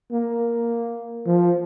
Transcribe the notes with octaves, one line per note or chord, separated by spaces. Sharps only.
A#3
F3